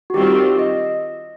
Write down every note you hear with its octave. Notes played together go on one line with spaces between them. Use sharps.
F#4
D#3 G3 C4 F4 G4
D#5